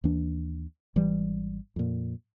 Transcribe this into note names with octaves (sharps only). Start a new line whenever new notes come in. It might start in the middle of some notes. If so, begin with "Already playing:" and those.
D#2 E3 D4
G#1 E3 G3
F2 A#2